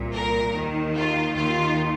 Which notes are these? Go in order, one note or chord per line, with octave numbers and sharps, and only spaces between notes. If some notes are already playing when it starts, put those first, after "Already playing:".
Already playing: C2 A#2
A#4
D#2 D#3
F4
D#2 D#3 F4